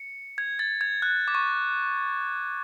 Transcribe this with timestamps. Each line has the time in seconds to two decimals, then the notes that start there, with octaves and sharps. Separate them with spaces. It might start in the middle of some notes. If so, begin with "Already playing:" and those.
Already playing: C#7
0.38 G#6
0.59 A6
0.81 G#6
1.02 F#6
1.28 D6
1.35 C#6